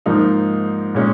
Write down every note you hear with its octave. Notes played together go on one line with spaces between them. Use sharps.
G#2 F3 A#3 D#4
A#2 G#3 C#4